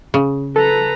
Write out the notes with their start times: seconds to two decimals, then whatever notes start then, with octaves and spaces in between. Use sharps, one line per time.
0.14 C#3
0.56 A4 B4 A#5